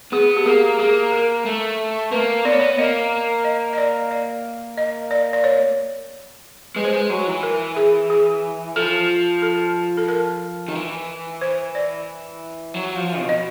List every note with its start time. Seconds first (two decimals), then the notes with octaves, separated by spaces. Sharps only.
0.12 B3 G#4
0.37 G4
0.45 A#3 G#4
0.79 A#3 G#4
1.12 A#4
1.46 A3
2.12 A#3 B4
2.45 B3 D5
2.52 C#5
2.59 D5
2.78 A#3 D#5
3.44 D#5
3.73 D#5
3.78 D5
4.11 D5
4.77 D#5
5.11 D5
5.33 D5
5.44 C#5
6.76 G#3 B4
6.85 C5
6.93 G#3 B4
7.10 F#3
7.27 E3
7.43 A#4
7.76 G#4
8.10 G#4
8.76 F3 A4
9.42 A4
9.97 A4
10.08 A#4
10.68 D#3
10.75 E3
11.41 C5
11.75 D5
12.74 F#3
12.96 F3
13.19 B2
13.29 D#5